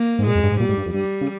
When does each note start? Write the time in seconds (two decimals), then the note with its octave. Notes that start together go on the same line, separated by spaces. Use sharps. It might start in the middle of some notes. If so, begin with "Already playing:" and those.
Already playing: A#3
0.19 G#2
0.26 A#2 G#3
0.35 F2
0.44 G2
0.52 G#2
0.60 A#2 G3
0.69 G#2
0.78 G2
0.86 F2
0.94 G2 G3
1.21 C#3